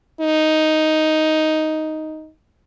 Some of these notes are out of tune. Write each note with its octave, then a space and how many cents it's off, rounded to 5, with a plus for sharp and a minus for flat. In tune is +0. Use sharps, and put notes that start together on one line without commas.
D#4 +5